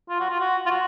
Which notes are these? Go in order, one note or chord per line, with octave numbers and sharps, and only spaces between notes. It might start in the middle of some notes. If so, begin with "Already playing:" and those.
F4
F#4
F4
F#4
F4
F#4